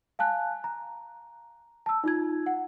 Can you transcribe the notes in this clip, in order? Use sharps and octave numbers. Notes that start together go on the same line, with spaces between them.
F5 G#5 A5 F#6
A#5
A5 E6
D#4 F4 G#6
F#5